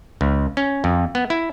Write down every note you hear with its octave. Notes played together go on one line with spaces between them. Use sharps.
C#2
C#4
F2
B3
E4